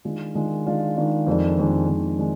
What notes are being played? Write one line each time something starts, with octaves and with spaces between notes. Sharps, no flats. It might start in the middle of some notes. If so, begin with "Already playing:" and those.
D#3 G#3 D4 F4
D#3 G#3 D4 F4
D#3 G#3 D4 F4
D#3 G#3 D4 F4
F2 D#3 G#3 D4
F2 D#3 G#3 D4
F2 D#3 G#3 D4
D#3 G#3 D4